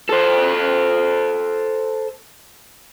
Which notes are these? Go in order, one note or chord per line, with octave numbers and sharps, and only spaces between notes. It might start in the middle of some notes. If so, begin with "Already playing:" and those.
A4 C5